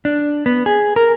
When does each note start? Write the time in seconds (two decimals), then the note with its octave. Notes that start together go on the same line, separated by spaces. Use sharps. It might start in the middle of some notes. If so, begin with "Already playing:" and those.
0.05 D4
0.46 B3
0.66 G#4
0.96 A#4